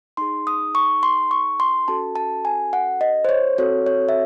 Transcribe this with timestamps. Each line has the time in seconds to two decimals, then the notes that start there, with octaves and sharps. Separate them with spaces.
0.17 D#4 G#4 C6
0.47 D#6
0.75 C#6
1.03 C6
1.31 C#6
1.60 C6
1.88 C#4 F#4 A4 A5
2.16 A5
2.45 G#5
2.73 F#5
3.01 D#5
3.25 C5
3.29 C#5
3.58 C4 F#4 A4 C#5
3.86 C#5
4.09 E5